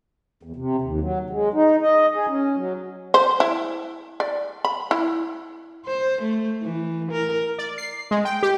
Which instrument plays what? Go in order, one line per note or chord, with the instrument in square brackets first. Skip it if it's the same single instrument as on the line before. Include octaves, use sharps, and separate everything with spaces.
[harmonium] E2
C3
D#2
F#3
G#3
D#4
D#5
G#4
C#4
F#3
[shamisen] C5
E4
D5
B5
E4
[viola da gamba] C5
A3
E3
A#4
[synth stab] D5
C7
G#3
G5
G4